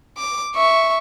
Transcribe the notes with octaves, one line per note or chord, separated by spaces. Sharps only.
D6
E5 C#6